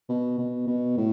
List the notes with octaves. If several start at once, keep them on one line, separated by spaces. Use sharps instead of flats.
B2
B2
B2
A2